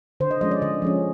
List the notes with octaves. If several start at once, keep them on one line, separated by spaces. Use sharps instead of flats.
D3 C5
D#5
F3 G#3 C#4 D#5
D5
D3 D#5
F3 G#3 C#4